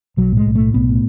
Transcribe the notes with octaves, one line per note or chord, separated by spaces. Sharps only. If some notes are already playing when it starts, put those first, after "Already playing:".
B1 F#3
A2 G#3
B1
A3
A2
B1 B3
A2